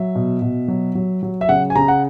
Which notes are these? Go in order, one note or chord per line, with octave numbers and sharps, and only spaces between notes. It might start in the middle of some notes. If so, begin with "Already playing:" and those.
Already playing: F#3 E5
B2
B2
F#3
F#3
F#3
E5
C#3 F#5
G#5
C#3 A#5
F#5